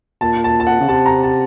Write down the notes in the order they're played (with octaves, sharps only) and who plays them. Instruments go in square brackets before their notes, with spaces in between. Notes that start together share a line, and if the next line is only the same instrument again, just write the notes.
[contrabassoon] A#2 [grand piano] A5
[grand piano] A5
A5
F#5
[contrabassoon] C#3
[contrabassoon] C3 [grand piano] A5
[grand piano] A#5
A5